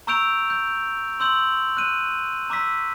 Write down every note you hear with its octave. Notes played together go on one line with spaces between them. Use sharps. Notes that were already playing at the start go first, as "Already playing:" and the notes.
A#5 C#6 E6 G6 D7 F7
G6
C6 E6 G6 F#7
F#6 D#7
A#5 D6 E6 B6